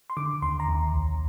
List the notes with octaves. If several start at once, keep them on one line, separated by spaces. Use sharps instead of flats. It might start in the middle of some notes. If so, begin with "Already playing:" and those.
C6
D3 D6
D#2 C6
A#5
D#2
C2